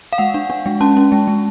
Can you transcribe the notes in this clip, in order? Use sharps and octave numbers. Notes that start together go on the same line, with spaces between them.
F5
G#3 F#5
D4
D4
G#3
C#4 A5
C#4
G#3
G#3